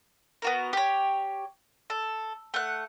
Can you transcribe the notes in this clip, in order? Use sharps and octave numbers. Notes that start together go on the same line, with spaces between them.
B3 F#4 A#4
G4 C#5
A4
A3 F#5